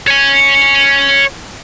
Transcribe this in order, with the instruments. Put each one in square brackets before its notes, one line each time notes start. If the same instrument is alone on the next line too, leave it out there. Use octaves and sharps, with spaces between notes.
[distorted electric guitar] C#5 G#5